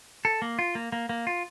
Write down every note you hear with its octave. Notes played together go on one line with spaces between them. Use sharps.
A4
A#3
F4
A#3
A#3
A#3
F4